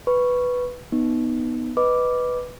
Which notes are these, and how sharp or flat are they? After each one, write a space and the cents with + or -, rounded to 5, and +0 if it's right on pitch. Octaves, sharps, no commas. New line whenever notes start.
B4 +0 C#6 +0
B3 +0 D#4 -5
B4 +0 D#5 +0 D6 -5